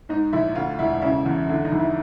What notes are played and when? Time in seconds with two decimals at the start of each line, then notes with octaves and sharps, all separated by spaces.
0.09 G#2 D#4
0.33 A#1 E4
0.55 D2 F4
0.79 E1 E4
1.02 C#3 E4
1.26 E2
1.49 D3 E4
1.65 D#4
1.72 F2
1.80 E4